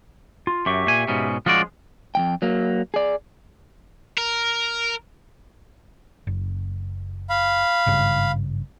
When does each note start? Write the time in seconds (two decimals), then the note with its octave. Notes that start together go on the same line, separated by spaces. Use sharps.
0.47 F4
0.66 F#2 G4 E5 C#6
0.87 A#2 G#5
1.08 G#2 B2 C#4
1.46 F3 G#3 C#4 F4 F#4 D5
2.15 F2 E3 G5
2.42 F#3 A#3
2.94 G#4 D5
4.18 A#4
6.27 F#1
7.30 F5 B5
7.86 G#1 G2 C#3